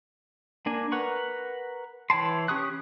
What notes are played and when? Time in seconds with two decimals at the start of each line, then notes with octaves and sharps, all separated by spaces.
0.66 A#3 D4 G#5
0.92 A#4 B4 F#5 C#6
2.10 E3 C#5 G5 A5 C6
2.48 C#4 G4 C#6 D#6 F#6